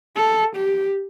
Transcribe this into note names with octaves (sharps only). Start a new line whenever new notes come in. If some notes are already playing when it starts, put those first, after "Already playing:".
A4
G4